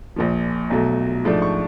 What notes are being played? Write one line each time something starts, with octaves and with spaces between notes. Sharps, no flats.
A#1 A#2 F3
B1 B2 F#3 A3
G#2 F3 A3 D4
C#6